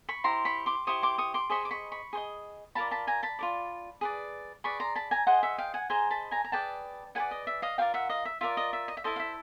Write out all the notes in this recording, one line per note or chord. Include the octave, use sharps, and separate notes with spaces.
B5 C#6
E4 G4 C5 A#5 C6
B5 C#6
C6 D6
E4 G4 C5 C#6 D#6
C6 D6
C#6 D#6
C6 D6
G#4 C5 D#5 B5 C#6
D6
B5 C#6
B5 C#6
G#4 C5 D#5
F4 A#4 D5 A5 B5
A5 B5
G#5 A#5
A5 B5
F4 A#4 D5
G#4 B4 D5
G#4 B4 D5 B5 C#6
A#5 C6
A5 B5
G#5 A#5
G#4 C5 D#5 F#5 G#5
E5 F#5
F5 G5
F#5 G#5
G#4 C5 D#5 G#5 A#5
A5 B5
G#5 A#5
A#5
G#4 B4 D5 G5 A5
G#4 B4 D5 F#5 G#5
D#5
E5
D#5 F5
F4 A#4 D5 F5 G5
E5 F#5
D#5 F5
E5
F4 A#4 D5 E5
D#5
E5
D#5
E5
E4 A4 C5 D#5
F5
E5